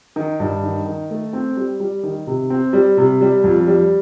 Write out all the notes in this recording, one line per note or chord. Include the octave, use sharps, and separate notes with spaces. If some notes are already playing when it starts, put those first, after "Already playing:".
D#3
G2
D#3
D#3
A3
C4
G3
G3
D#3
C3
C4
G3
C3
G3
F2
G3